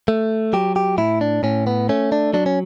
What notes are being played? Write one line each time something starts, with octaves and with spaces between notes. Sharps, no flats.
A3
F#3 G4
G4
A2 E4
D4
A2 C#4
B3
A3 C#4
D4
F#3 D4
C#4